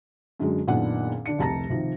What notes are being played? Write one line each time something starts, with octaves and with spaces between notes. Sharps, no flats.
F#2 D3 F#3 G#3
F#1 A#2 D#3 B3 D4 F#5
D3 D4 C#7
F1 C2 A5 A#5 A#6
C3 D#3 F3